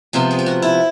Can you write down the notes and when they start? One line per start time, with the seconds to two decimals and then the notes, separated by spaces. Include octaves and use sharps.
0.13 C3 F3 G#3 B3 G#4
0.31 G#4
0.39 G4
0.46 F#4
0.62 E4